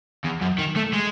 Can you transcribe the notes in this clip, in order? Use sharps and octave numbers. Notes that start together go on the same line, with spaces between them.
E2
F#2
D#3
A3
G#3